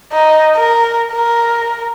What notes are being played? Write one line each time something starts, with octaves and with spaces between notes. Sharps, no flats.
D#4
A#4
A#4